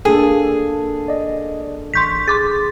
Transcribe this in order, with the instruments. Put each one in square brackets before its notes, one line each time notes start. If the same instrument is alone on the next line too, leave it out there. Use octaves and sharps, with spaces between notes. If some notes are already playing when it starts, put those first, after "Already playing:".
[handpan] A#3 D4 A4 [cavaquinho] G#4
[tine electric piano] D5 D#5
[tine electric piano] A1 C#6 [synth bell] C6 G6 B6
[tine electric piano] G#4 [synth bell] C6 D6 A6